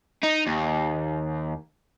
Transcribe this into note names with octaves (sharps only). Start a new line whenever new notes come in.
D#4
D#2